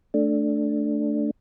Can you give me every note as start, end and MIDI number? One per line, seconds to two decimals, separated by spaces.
0.14 1.31 57
0.14 1.31 62